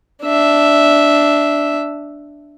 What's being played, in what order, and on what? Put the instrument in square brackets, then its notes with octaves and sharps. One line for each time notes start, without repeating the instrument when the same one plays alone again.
[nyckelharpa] D4 E5